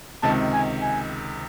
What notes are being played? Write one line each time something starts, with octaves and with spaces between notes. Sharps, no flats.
C#2 C3 D#3 A5
G#5
G#5